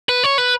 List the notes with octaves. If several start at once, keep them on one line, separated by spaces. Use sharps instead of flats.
B4
C#5
B4